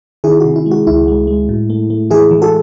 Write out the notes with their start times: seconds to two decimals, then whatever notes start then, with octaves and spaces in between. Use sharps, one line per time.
0.24 D#3 E4 G#4
0.40 C3 F#4
0.56 E4
0.66 G#3
0.71 F#4
0.87 C#2 E4
1.08 G#3
1.27 G#3
1.49 A2
1.70 A3
1.90 A3
2.10 E3 E4 G#4
2.31 E3
2.42 F#4 A4